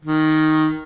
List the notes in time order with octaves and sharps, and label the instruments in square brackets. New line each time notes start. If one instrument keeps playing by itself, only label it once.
[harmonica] D#3